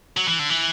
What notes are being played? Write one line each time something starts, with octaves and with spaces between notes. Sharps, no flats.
F#3
E3
D3
E3